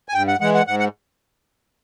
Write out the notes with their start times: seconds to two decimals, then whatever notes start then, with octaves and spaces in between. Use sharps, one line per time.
0.09 G#5
0.14 G2 G5
0.28 F#5
0.40 E3 G#3 F#5
0.54 F#5
0.67 G#2 F#5
0.79 F#5